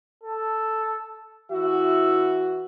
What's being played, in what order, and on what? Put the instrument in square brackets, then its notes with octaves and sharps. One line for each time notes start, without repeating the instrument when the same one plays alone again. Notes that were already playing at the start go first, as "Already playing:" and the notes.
[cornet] A4
[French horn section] E3 E4 F#4 [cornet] E5